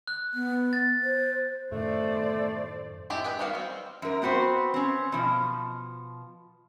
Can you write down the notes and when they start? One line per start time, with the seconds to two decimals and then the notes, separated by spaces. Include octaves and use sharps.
0.08 F#6
0.34 B3
0.73 A6
1.03 C5
1.72 F#2 A2 D#3 A3 C5 D5
3.10 G#3 C4 D4 E4 G4
3.24 G4 G#4 B4
3.39 D#3 G3 B3 F#4 F5
3.54 G3 C4
4.02 F#2 A#4
4.22 B3 C4 F#4 B4 C5
4.74 C4 C#4
5.12 B2 F3